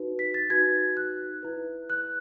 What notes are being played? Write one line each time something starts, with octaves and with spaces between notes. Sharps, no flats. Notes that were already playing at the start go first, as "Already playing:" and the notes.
Already playing: D#4 F#4 B4
B6
A6
D#4 F#4 B4 G#6
F#6
E4 B4
F#6